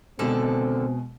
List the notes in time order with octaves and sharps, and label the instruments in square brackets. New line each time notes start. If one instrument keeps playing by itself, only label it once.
[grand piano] B2 G#3 [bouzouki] D3 D#3 A4 [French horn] C4